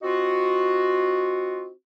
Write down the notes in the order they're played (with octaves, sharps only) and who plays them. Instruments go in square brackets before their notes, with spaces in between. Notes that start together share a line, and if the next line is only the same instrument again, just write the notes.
[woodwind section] C4 D#4 F4 F#4